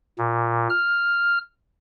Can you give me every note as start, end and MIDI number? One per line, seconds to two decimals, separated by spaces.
0.18 0.68 46
0.70 1.38 89